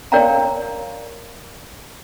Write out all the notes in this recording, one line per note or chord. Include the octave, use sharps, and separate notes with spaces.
A#4 C#5 D5 F5 G5 A#5